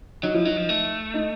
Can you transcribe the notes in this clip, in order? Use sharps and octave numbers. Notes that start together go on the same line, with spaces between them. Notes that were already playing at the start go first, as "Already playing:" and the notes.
F#3 D#4
F3 E4
F#3 D#4
F3
A3
D#4